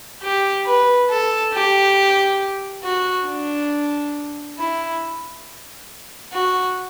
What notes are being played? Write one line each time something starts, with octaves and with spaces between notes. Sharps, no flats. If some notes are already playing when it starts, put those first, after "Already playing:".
G4
B4
A4
G4
F#4
D4
E4
F#4